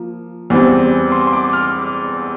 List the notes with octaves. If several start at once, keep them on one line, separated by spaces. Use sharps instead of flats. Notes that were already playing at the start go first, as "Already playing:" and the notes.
Already playing: F3 A#3
E2 E3 G3 C4
C6
C6
D6
F6